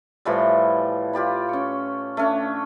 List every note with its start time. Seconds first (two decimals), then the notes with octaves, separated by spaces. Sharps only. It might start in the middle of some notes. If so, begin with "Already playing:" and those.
0.25 A2 E3 F3 G3
1.13 F4 G4 D5 B5
1.49 C#4 C#6
2.17 A3 C#4 D4